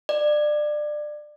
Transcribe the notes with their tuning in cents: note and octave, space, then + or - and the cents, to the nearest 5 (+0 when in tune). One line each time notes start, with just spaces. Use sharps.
D5 +25